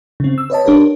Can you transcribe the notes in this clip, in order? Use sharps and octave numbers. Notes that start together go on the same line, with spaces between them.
C#3 C4
E6
B4 C#5 D#5 A5
D4 G4 A#4 B4 C#5